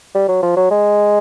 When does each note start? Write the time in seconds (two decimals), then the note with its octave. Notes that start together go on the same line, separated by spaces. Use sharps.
0.15 G3
0.28 F#3
0.42 F3
0.56 F#3
0.71 G#3